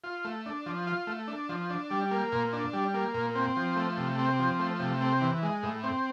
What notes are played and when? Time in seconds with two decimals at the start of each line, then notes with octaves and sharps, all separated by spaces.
0.04 F4
0.25 A3
0.46 D4
0.66 F3
0.87 F4
1.07 A3
1.28 D4
1.49 F3
1.70 D4
1.91 G3
2.11 A#3
2.32 A#2
2.53 D4
2.73 G3
2.94 A#3
3.14 A#2
3.35 C4
3.57 F3
3.76 A3
3.97 C3
4.19 C4
4.39 F3
4.59 A3
4.80 C3
5.01 C4
5.21 E3
5.43 G#3
5.63 A2
5.83 C4